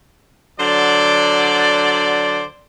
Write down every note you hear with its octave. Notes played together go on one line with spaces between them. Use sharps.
D3 F#3 C5 D5